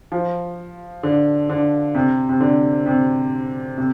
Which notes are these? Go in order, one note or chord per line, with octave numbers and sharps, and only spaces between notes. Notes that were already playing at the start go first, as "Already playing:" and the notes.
F3
D3
D3
C3
C3
D3
C3
C3